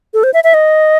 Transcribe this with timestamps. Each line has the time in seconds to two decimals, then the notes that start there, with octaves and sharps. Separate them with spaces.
0.14 A4
0.24 C5
0.34 E5
0.44 E5
0.54 D#5